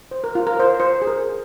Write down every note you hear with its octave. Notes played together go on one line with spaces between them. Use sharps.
C5
A#4
F4
A#4
C5
C5
G#4
A#4